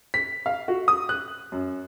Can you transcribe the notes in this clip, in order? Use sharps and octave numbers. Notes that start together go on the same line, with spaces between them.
B6
F5
F#4
D#6
F#6
F#2